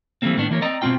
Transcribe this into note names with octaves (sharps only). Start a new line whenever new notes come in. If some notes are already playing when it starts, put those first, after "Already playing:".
E3 G3 A3 A#3 C4
A2 D#3 B3 D4
E3 A#3 A#4 C#5
C4 D5 D#5 G5 A#5
B2 G#3 C4 F4 G5